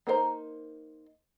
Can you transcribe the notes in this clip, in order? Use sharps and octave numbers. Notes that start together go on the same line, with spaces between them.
A#3 D#4 A#4 C5 A#5